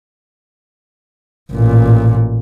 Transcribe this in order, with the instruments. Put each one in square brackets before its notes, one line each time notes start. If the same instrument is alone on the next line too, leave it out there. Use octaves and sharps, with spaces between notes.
[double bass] A1 A#2